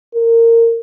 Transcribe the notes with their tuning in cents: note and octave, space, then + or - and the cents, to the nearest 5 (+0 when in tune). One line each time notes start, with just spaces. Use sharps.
A#4 -20